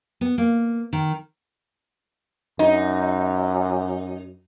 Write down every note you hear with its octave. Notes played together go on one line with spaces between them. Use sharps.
B3
A#3
D#3
F#2 D#4